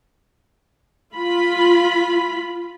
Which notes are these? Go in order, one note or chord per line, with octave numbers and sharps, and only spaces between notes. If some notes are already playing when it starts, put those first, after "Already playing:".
F4 B5